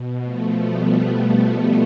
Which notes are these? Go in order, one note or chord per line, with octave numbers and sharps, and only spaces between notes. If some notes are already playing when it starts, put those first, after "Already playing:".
Already playing: B2
F3 A3
G3 B3